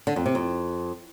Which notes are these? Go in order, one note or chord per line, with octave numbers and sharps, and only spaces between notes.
D3
F2
C3
F2